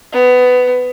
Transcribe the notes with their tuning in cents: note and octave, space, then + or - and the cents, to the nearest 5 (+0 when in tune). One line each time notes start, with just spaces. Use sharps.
B3 +20